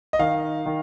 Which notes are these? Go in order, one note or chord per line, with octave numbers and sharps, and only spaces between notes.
D#5
D#3 F5
D#3